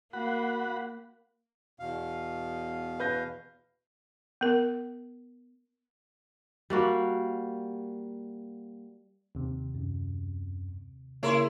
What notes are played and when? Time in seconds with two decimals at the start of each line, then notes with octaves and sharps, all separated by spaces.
0.13 A#3 F#4 F#5 B5
1.79 E2 B2 F5
3.00 B4 G6 A#6
4.41 B3 A#4
6.70 G3 A#3 F#4
9.35 D#2 C3
9.75 F#2
11.23 C#3 A#3 E4 G#4 A#4 C#5 C6